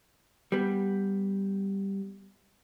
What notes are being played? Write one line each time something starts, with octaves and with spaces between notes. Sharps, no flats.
G3 B3